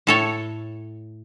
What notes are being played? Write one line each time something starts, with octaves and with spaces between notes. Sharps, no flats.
A2 A4 C#5